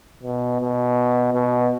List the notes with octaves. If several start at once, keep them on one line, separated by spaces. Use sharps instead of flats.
B2
B2
B2